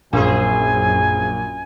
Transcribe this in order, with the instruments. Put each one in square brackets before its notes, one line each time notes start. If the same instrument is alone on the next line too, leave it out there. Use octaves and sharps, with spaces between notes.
[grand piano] A#1 A#3 [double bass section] F#2 [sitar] C4 G#4 [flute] G#5